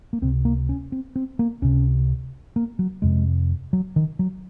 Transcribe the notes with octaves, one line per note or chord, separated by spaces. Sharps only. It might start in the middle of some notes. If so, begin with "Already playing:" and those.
A#3
C#2 C3 C4
A#3
C#4
C4
C4
A#3
C#2 C3 C#4
A#3
F#3
F2 C3 G#3
F#3
D#3
F#3